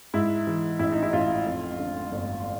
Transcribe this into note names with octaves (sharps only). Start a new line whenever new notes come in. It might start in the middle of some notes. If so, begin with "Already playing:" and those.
G#2 E4
E3
A1 E4
D#4
E4
A1 F4
F2
D3
G1